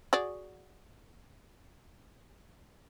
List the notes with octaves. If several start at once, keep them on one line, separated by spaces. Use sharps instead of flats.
F#4 G#4 D5